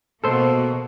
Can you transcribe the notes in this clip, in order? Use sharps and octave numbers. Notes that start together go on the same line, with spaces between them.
B2 A#3 A4 C5